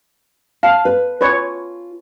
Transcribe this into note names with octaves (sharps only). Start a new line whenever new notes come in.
F5 A5
B4
F4 B4 C#5